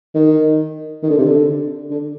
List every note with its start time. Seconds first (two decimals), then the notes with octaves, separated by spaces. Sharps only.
0.15 D#3
1.03 D#3
1.10 D3
1.18 C3
1.25 D3
1.91 D3